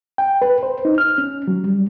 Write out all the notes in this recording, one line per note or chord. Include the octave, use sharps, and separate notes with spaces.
G5
B4
C5
D#4
F6
C#4
F#3
G3